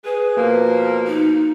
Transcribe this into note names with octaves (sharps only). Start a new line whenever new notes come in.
G#4 B4
B2 F3 A#3
D#4